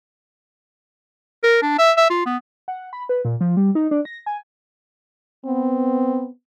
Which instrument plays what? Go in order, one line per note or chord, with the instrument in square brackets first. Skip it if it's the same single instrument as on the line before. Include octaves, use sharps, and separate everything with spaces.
[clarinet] A#4
D4
E5
E5
F4
B3
[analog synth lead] F#5
B5
B4
A#2
F3
G3
D#4
D4
A#6
G#5
[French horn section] B3 [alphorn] C4